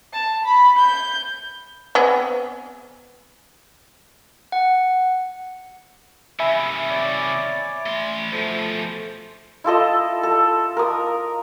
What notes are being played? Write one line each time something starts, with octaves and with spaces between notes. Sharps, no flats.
A5
B5
G6
B3 C4 G#4
F#5
C3 D#3 E5 G#5 B5
C#5 D5 D6
A3 C6
B2 F3 A3 C5
E4 F4 A4 D#5
A4
A#4 D#6